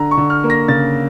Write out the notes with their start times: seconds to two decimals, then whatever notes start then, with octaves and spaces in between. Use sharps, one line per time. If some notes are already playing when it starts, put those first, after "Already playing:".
Already playing: D3 A#5
0.11 C#6
0.17 D3
0.30 F6
0.44 A#3
0.50 A#6
0.68 C#3 A6